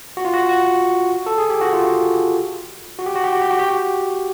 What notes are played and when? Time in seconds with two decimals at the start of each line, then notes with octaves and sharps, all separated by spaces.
0.17 F#4
0.25 F4
0.34 F#4
0.49 F#4
1.26 A4
1.38 G#4
1.50 G4
1.61 F#4
1.73 F4
2.99 F#4
3.06 G4
3.16 F#4
3.24 G4
3.33 F#4
3.41 G4
3.50 F#4
3.59 G4
3.68 F#4